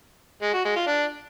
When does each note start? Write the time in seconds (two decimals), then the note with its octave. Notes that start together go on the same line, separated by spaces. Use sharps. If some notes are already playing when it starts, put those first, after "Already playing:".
0.42 G#3
0.54 F#4
0.65 G#3
0.76 F4
0.87 D4